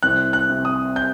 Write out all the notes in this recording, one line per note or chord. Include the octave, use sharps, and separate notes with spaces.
C2 F#6
F#6
C3
D#6
G6